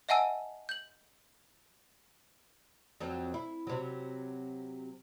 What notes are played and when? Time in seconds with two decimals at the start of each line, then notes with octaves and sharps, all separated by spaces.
0.09 D#5 E5 F#5 G#5 A5 E6
0.69 G6 F#7
3.00 F2 F#3 C4
3.34 E4
3.67 C3 F#3